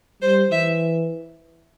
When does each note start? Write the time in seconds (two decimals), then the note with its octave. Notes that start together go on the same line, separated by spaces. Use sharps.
0.22 G3 C5
0.51 E3 E5